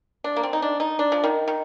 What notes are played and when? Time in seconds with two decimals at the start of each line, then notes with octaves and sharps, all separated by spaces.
0.24 D4
0.36 A#3
0.43 C4
0.53 D#4
0.62 D4
0.80 D#4
0.99 D4
1.12 F3
1.24 D#3
1.48 D#3